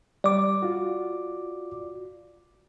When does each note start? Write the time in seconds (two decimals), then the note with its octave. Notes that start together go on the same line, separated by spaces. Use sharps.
0.24 G3 D5 D6
0.62 F4 F#4